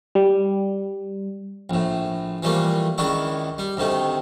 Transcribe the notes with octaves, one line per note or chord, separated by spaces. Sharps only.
G3
A#1 A2
E3 F3 G3 A3 A#3
C#2 D#3 D4 E4 C#6
G3
D2 C3 D#3 A3